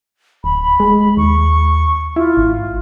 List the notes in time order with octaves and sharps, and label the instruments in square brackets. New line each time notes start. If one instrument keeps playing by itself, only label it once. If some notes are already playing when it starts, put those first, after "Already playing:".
[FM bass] D1 [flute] B5
[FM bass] G#3
[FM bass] D#2 [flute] C#6
[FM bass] E4 [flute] F4
[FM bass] G#1